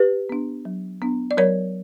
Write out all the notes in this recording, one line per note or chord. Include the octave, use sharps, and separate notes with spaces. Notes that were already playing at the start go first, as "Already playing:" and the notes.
Already playing: G4 B4
B3 D4
F#3
B3 D4
D5
F#3 A#4 C#5